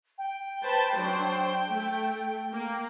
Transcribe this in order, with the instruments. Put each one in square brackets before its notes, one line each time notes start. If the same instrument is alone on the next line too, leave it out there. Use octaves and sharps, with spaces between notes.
[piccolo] G5
[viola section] B4 C5 A5
F#3 D4 C5
A3
A#3